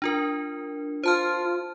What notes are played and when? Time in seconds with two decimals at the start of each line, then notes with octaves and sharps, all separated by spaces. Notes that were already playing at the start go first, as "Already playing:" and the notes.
0.02 D4 F4 A#4
1.04 F4 C5 A5 F6